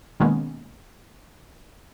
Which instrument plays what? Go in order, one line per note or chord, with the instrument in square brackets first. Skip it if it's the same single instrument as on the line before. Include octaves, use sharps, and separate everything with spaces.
[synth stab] B2 D#3 G#3 A#3 B3 C#4